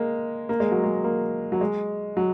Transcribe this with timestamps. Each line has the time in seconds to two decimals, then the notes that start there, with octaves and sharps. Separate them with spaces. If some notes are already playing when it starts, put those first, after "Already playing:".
Already playing: G#3 A#3
0.49 A#3
0.60 G#3
0.71 F#3
0.84 G#3
1.04 A#3
1.52 F#3
1.61 G#3
2.17 F#3